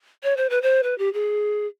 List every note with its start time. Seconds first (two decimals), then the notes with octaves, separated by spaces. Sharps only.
0.23 C#5
0.37 C5
0.50 B4
0.62 C5
0.83 B4
0.98 G4
1.13 G#4